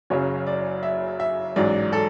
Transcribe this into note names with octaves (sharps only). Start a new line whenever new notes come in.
F#1 F#2 C#3 F#3 C#4 C#5
D5
E5
E5
A1 G#2 F#3 D5
A4